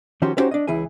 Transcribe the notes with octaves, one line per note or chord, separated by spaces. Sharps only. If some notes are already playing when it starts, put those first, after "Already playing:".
D#3 F3 C#4 F#4 G4 C6
B3 C#4 D#4 F#4 G4 C5
D4 D#5
C#2 E3 E4 G#4 G#5